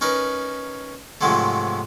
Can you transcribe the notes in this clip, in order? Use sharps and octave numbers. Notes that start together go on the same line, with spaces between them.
C#4 D#4 A#4 B4
G#2 C3 F3 F#3 G#3 A3